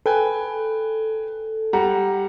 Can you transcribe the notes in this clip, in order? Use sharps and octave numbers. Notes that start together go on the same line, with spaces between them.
A4 B4 G5 G#5
G3 F#5 A#5